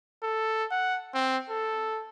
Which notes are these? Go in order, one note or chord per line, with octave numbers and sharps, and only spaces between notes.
A4
F#5
C4
A4